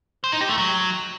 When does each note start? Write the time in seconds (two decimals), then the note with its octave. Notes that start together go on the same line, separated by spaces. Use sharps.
0.24 C5
0.32 D#4
0.41 G4
0.49 A3
0.58 F#3